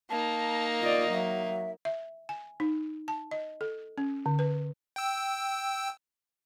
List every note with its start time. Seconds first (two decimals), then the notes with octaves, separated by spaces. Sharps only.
0.10 A#3 D#4 A5
0.82 F4 D5 D#5
1.13 F#3 E5
1.85 E5
2.29 G#5
2.60 D#4
3.08 A5
3.31 D#5
3.61 A4
3.98 C#4
4.26 D3
4.39 B4
4.96 G5 E6